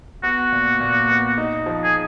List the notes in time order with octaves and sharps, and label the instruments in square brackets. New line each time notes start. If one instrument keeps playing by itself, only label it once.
[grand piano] B3 [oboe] F#4
[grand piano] A#2
A#2
B3
D#4
F3
[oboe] G#4